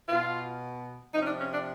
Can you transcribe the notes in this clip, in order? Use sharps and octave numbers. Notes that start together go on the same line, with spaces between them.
B2 F4
C3 F3 D#4
C#4
D4
C#4
D4